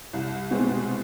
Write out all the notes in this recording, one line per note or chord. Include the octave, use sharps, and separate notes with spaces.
C2
B2 G#3 C4